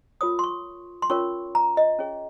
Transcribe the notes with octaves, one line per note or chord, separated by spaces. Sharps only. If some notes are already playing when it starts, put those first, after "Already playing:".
F4 A#4 C#5 D#6
C6
C#6
C6
C#4 F4 A#4 C#5 C#6
A#5
D#5
C#4 G#4 C#5